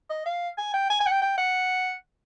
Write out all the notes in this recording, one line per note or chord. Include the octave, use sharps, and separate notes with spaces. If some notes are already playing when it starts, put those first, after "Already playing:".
D#5
F5
G#5
G5
G#5
G#5
F#5
G5
G5
F#5